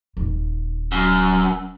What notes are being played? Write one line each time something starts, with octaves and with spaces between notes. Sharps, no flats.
D#1 D#3
F#2